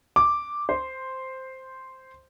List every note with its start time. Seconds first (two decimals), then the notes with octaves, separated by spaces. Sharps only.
0.16 D6
0.69 C5